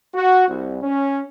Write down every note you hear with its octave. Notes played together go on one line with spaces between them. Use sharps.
F#4
C2
C#4